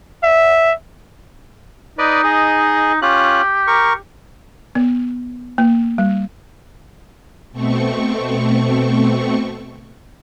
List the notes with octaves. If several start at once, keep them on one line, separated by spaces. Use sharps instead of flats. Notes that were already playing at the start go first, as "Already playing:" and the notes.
E5
D#4 B4 D5 D#5
G#4 D#5
C#4 F4 G4 F#6
A#4 C#6
B3
A#3
G3
B2 A3 C4 C#6